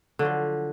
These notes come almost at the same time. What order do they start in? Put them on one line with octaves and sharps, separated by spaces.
D3 F#3 F3